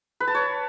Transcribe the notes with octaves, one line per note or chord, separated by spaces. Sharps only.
B4
A5
C#5